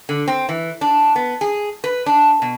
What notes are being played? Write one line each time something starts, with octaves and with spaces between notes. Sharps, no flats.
D3
C4
E3
D4
B3
G#4
B4
D4
B2